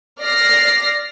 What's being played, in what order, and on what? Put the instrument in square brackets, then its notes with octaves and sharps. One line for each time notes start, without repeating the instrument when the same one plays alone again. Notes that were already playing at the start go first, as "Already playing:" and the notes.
[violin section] D5 F6 A#6 C7